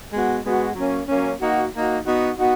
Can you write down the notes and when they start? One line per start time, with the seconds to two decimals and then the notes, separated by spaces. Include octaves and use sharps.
0.12 G#3 B3 F#4
0.44 G#3 B3 F#4
0.75 F#3 A#3 C#4
1.08 F#3 A#3 C#4
1.40 A#3 D#4 F#4
1.73 A#3 D#4 F#4
2.05 B3 D#4 F#4
2.36 B3 D#4 F#4